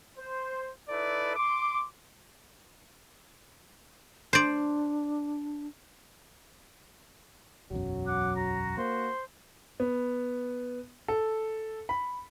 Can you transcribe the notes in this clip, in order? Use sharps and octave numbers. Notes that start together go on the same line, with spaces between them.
C5
D#4 E4 A4 B4 D5
C6 D6
D4 C5 D5
E1 B1 F#2 F#3
F#5 D6
F#4 A#5
A#3 C5
B3
A4
B5